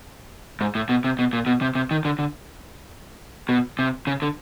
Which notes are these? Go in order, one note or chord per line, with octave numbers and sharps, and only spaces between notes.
G#2
A2
B2
C3
B2
A#2
B2
C3
C3
D#3
D3
D3
B2
C3
C#3
D3